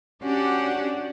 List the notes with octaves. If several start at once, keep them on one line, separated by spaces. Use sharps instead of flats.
C#4 D4 F#4 G4 D5 F#5